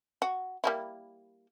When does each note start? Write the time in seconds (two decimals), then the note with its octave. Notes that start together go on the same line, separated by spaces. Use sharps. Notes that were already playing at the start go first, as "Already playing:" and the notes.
0.22 F#4
0.64 G3 A#3 E4